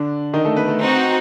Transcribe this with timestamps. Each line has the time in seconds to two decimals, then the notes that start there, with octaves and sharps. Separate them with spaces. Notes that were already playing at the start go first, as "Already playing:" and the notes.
Already playing: D3 D4
0.33 D#3 D#4
0.45 A3 A4
0.56 B3 B4
0.68 A3 A4
0.80 C4 D#4 F#4